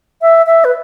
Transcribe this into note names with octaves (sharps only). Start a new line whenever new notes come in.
E5
E5
B4